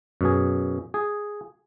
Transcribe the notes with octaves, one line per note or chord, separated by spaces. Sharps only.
F#2 B2 G#4
G#4